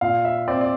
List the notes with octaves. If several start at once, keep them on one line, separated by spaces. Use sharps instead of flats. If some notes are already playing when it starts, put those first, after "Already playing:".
A#2 F5
E5
C4 D5
D5